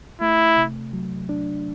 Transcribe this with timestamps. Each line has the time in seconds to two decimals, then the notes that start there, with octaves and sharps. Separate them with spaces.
0.21 A3 E4
0.57 C3
0.93 F#3
1.29 D4